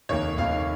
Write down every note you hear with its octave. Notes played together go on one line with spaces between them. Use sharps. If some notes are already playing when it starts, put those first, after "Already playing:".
F1 D#2 D#3 A#3 C#5
F1 D#2 D#3 A#3 F5